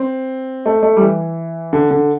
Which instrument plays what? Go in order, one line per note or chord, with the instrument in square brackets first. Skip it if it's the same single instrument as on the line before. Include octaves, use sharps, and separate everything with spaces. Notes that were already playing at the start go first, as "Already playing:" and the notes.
Already playing: [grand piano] C4
A3
A3
G3
E3
D3
D3